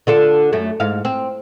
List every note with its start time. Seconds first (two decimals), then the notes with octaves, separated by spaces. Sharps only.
0.07 D3 F4 A4
0.52 F#2 A3
0.80 G#2 F5
1.05 C4